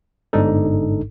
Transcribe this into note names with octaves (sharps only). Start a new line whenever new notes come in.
G1 G#2 D4 D#4 A4